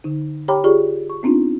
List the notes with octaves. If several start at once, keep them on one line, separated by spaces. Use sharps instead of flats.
D3 D#4
G4 C#5 G5 A#5 B5 D6
F4 G4 G#4 D5 C#6
C#6
B3 C4 D4 D#4 F4